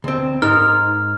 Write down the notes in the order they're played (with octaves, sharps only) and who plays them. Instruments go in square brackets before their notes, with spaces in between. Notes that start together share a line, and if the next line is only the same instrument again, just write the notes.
[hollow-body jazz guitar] D2 C4
[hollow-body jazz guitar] G#2 A#4 [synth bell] D#4 [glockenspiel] F6